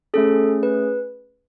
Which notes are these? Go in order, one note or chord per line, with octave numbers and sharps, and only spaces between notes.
A3 C#4 G#4 A4
B4